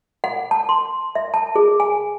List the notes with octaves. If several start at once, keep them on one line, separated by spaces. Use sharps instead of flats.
F#5
A5
C6
E5
A5
G#4
G#5